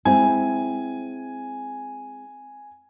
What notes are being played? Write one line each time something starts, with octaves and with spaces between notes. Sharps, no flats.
G#3 C4 E4 G#5